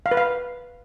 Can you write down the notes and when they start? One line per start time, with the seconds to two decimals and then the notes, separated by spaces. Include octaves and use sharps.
0.06 F5
0.11 B4
0.17 F5